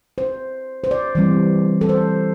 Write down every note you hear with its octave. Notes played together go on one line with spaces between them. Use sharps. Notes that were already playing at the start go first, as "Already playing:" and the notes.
C5
C5
D5
E3 G3 C4
A4
C5